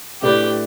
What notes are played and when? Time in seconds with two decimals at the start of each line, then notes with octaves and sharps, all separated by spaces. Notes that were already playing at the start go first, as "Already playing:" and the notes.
0.22 A2 A3 D4 G4 B4 D5